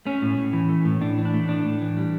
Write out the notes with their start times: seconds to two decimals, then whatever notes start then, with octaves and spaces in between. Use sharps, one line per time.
0.06 A3 C#4
0.22 A2
0.38 A2
0.53 E3
0.69 A3
0.85 A2
1.01 A2 D4
1.18 E3
1.25 D4
1.34 A3
1.49 A2 D4
1.66 A2
1.82 E3
1.97 G3